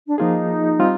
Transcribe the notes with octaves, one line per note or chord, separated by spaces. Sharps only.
D4
F3 A#3 D#4 F4 G#4
G3 C4 F4